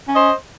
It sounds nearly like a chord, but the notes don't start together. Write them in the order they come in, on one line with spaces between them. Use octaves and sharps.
C#4 D#5 C5